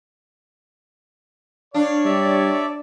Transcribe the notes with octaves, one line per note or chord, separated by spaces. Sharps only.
D4 C#5 F5
G3 D5 E5